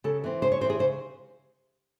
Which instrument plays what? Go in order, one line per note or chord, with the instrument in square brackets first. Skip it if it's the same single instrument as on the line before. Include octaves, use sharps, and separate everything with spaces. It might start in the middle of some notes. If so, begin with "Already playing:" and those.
[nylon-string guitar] C#3 A4
E3 C4
C#3 C5
C#5
C4 C5
E3
G#4
C#3 C5